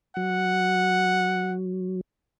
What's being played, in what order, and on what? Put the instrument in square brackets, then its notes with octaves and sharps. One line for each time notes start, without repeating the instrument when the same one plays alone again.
[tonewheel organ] F#3 [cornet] F#5